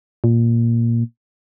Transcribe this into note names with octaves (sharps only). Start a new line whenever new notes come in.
A#2